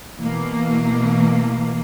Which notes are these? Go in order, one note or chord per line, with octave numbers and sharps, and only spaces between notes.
B2 E3 A#3